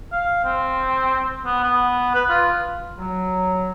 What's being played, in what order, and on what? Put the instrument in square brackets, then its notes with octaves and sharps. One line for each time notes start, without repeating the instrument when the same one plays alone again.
[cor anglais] F5
C4
B3
B3
B4
F4
[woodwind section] F#3